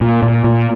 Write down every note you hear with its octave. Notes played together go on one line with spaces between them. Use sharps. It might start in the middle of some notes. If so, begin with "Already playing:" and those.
A#2
A#2
A#2